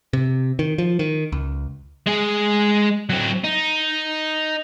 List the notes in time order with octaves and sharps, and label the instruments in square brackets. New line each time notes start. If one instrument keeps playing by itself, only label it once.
[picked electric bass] C3
D#3
F3
D#3
C#2
[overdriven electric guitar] G#3 G#4
F#3 C4
D#4